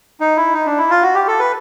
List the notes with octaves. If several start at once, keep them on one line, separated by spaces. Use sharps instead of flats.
D#4
E4
D#4
D4
E4
F4
F#4
G4
A4
B4